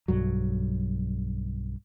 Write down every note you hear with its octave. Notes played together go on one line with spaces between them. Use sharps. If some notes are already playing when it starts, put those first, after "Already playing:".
B1 G2 F#3